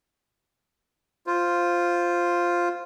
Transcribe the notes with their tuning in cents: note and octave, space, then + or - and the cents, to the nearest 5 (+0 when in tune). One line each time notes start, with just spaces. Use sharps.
F4 +0 C5 +0